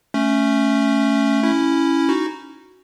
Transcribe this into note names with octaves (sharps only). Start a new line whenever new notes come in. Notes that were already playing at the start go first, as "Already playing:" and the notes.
A3 C#4
C#4 E4
D#4 F#4